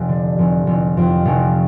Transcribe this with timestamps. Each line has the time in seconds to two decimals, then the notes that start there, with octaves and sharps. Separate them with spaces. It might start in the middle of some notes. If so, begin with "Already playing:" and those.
Already playing: F1
0.09 D3
0.39 F1
0.67 F1
0.97 F2
1.25 F1